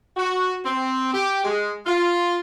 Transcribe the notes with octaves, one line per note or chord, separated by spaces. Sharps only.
F#4
C4
G4
G#3
F4